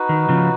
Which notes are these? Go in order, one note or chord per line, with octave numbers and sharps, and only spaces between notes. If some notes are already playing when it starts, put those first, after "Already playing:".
Already playing: D#4 F#4 B4
D#3
C#3 F3